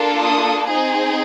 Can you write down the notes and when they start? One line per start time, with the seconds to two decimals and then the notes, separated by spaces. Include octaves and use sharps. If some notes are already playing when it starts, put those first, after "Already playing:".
Already playing: A#3 D4 F4 A4
0.22 D#6
0.68 C4 D#4 G#4